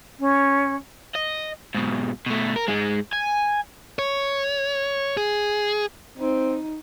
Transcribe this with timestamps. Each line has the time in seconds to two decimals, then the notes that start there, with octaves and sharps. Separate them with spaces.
0.19 C#4
1.15 D#5
1.75 G#2 B2
2.26 B2 A3
2.56 A#4
2.68 G#2 G#3
3.13 G#5
3.99 C#5
5.17 G#4
6.18 C4 D#4